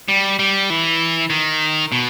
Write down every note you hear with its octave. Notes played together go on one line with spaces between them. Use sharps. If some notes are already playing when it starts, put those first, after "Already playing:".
G3
G3
E3
D#3
B2